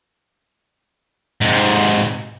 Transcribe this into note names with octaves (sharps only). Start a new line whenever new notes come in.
G#2 C3